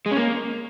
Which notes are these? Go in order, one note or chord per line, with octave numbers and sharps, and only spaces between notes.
G#3
C#4
A#3